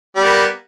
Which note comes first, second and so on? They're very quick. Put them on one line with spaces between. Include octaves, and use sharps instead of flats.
G3 B3 A#3